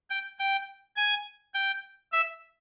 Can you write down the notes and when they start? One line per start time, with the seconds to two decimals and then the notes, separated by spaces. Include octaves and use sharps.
0.10 G5
0.39 G5
0.97 G#5
1.54 G5
2.12 E5